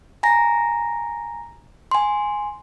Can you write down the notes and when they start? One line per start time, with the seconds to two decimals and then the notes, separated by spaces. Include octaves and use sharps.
0.23 G#5 A#5 A#6
1.91 G#5 C6